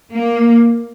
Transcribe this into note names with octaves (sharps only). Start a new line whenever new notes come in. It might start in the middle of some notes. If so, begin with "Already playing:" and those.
A#3